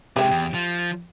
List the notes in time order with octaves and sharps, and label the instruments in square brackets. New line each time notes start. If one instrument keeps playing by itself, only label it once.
[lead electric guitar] C3 G#3 [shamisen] G4 E5 G5
[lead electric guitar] E2
F3